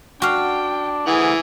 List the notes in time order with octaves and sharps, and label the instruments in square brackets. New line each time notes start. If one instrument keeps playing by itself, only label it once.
[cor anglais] D4 [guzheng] F#4 F5 [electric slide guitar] G5
[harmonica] E3 [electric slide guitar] A3 F#5 [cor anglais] G#4